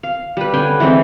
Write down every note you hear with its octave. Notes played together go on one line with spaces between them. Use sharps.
F5
G3 B4
D3 C#4 G5 G#5
E3 G#3 C4 D#4